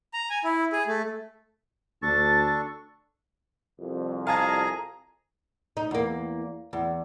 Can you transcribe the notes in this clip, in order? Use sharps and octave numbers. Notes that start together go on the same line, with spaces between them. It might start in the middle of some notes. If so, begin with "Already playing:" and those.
A#5
G#5
E4
G#4
A3
D2 D4 A4 C#6 A6
C2 F2
G#4 F5 A5 A#5 G#6
D#4
E2 A#3
E2